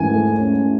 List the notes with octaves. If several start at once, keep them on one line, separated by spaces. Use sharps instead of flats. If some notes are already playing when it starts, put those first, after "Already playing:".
Already playing: G#2 E3 A3 G#5
A3
C#4